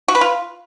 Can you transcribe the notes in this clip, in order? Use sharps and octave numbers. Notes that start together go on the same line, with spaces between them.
F#4
B4
F4